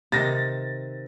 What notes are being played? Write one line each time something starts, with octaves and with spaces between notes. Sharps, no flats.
C3 D#3 A6 A#6